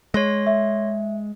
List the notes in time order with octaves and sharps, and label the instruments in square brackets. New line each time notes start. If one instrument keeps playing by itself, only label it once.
[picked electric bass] G#3 [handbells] C#5 C6 A#6
[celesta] E5